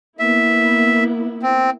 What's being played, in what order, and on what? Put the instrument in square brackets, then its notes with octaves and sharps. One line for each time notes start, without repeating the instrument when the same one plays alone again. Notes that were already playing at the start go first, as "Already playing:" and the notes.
[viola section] A#3 B3 E4 [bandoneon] E5
[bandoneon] C4